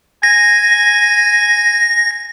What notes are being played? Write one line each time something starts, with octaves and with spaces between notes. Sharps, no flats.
G#5 A#6